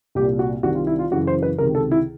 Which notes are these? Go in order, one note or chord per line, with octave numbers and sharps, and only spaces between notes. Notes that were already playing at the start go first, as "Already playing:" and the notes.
C2 A#2 G4
F#4
C2 C3 D#3 F#4
F4
E4
F4
F#2 C#3 E3 F#4
C5
B4
C#2 C3 D#3 A#4
A4
E4